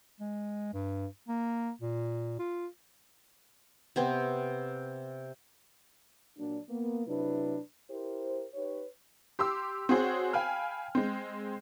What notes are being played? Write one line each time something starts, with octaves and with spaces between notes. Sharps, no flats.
G#3
G2
A#3
A#2
F4
C3 B3 C4
A#2 F#3 D4
A#3 B3
C3 F#3 D4 E4 B4
E4 G4 A#4 C5
D#4 G4 B4 C#5
G4 C6 D6 E6
C4 F#4 G#4 C5 C#5
F5 G5 G#5 B5 F6
G#3 C4